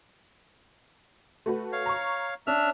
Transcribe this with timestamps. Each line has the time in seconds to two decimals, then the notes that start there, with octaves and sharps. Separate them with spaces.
1.46 A3 F#4 B4
1.72 C#5 F5
1.86 A#5 C#6
2.47 C#4 D4 E5 F6